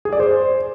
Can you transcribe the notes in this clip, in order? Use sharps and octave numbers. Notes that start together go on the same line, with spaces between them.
G#4
D5
C5